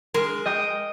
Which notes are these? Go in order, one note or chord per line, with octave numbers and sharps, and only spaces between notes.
G#3 A#4
D#5 G5 D#6